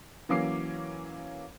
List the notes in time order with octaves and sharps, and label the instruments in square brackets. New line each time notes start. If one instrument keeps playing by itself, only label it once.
[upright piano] E3 F#3 A#3 C#4 D6 C7